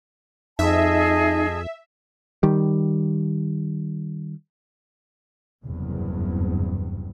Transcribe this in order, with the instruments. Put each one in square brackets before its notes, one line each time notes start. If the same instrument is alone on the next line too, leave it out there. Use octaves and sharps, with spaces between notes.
[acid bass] F2 [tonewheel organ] D#4 [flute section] G#4 D#5 A5 [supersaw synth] E5
[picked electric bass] D#3 G3
[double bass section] F#1 E2 G2 C3